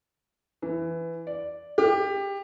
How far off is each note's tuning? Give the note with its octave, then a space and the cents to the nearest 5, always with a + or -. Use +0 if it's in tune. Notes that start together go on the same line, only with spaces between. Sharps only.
E3 +10
D5 -5
G4 +20